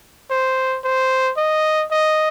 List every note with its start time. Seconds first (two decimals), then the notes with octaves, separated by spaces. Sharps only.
0.31 C5
0.84 C5
1.37 D#5
1.91 D#5